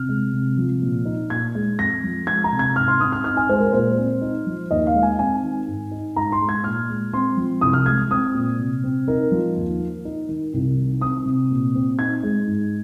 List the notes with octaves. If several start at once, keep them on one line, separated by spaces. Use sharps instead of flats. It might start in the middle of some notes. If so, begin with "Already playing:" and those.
Already playing: C3 F6
G#3
C3
F3
A#2
D#4
A#2 G#6
G#3
F2 A#6
F3
G#3 G#6
A#5
C3
G#6
G#2 F6
C6
C4 D#6
F6
D#4 F6
G#5
G#3 C5
A#4
A#2 C5
C4
D#4
F3
D#2 D#5
F5
G#3
G#5
C4 G#5
D#3
G#2
D#4
G#2 A#5
C6
G#3
G#6
A#2 F6
G#3
C4 C6
F3
C2 D#6
F6
G#3 G#6
C4 D#6
A#2
C3
C4
D#4 A#4
F3
D#2
A#3
D#4
D#3
C2
D#3
C4 D#6
C3
A#2
C4
D#4 G#6
G#3
G#2